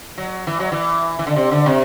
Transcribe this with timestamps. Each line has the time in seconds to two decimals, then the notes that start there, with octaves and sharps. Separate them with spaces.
0.18 F#3
0.47 E3
0.60 F#3
0.72 E3
1.19 E3
1.27 D3
1.36 C3
1.51 D3
1.66 C3